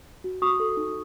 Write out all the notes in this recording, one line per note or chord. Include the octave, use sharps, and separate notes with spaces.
F#4
F#4 C#6 D#6
A4
D#4